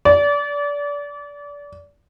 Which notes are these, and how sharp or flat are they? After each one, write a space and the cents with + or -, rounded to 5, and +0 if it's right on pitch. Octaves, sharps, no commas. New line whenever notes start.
D5 -30